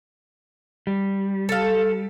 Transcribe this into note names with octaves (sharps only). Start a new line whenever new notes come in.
G3
A4 F5